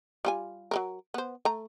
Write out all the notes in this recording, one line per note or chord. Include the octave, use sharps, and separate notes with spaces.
G3 F4 G#5
F#3 G#3 A#4
B3 C5
A3 A#5